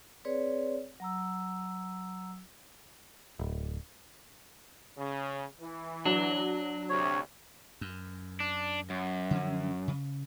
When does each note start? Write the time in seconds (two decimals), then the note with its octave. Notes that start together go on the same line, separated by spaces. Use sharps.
0.25 C4 G#4 B4 C#5 D5
1.00 F#3 A#5 E6
3.39 D1
4.98 C#3
5.61 E3
6.05 F#3 D4
6.89 D2 C3 C#5
7.81 F#2
8.40 D4
8.90 F#2
9.31 D3 F3 C#4
9.88 C#3